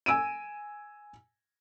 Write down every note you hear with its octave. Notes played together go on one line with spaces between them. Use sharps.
G#5 E6 D7 D#7